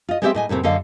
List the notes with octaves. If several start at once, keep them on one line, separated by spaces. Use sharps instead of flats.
F4 D#5
G#3 B3 C4 G4 D5 E5
A2 D#5 G#5
F#2 A2 C3 C4
F#2 D3 A4 D#5 F5